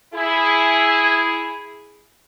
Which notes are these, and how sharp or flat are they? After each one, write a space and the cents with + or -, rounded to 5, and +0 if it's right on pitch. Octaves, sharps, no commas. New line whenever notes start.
E4 +0 G#4 +0